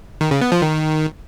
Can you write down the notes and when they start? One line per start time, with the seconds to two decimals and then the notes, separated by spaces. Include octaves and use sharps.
0.21 D#3
0.31 C#3
0.41 B3
0.52 F3
0.62 D#3